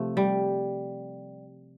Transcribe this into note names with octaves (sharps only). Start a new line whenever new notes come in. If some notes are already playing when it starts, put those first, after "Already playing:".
Already playing: C3 F3 A3
G3